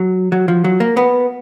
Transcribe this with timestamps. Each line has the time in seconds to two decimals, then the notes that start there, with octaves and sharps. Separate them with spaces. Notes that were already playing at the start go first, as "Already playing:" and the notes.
Already playing: F#3
0.32 F#3
0.48 F3
0.64 F#3
0.80 A#3
0.97 B3